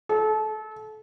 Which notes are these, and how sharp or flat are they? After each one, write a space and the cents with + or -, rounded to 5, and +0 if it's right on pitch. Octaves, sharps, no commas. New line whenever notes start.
A4 -30